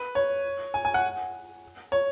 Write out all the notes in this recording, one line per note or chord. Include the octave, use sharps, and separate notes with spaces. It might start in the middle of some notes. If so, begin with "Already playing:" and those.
Already playing: B4
C#5
G#5
G#5
F#5
C#5